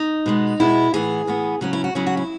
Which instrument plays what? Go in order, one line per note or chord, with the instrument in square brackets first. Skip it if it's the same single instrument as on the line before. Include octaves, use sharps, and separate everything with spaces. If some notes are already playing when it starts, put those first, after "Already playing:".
Already playing: [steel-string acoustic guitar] D#4
B2 G#3 B3
B2 G#3 B3 E4
A2 E3 B3 G#4
A2 E3 B3
C#3 F#3 C#4 F#4
E4
F#4
C#3 F#3 C#4 E4
F#4
E4